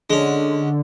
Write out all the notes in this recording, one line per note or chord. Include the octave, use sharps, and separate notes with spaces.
D3 G#3 C#4